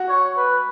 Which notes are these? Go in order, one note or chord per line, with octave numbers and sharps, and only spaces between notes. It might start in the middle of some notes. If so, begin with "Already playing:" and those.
Already playing: F#4
C#5
B4